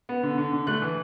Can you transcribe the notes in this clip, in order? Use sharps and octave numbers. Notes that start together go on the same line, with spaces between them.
B3
D3
D3
D3
A3 F#6
E3